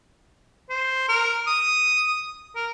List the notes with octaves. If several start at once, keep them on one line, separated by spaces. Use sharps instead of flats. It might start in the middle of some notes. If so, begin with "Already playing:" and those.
C5
A#4
D#6
A#4